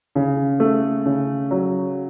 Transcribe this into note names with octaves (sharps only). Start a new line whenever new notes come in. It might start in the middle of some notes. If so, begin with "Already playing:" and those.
C#3
A3
C#3
F#3